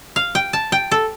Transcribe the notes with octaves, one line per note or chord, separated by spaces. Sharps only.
F5
G5
A5
G5
A4